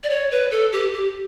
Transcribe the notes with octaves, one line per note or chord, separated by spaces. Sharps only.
D5
C#5
B4
A4
G4
G4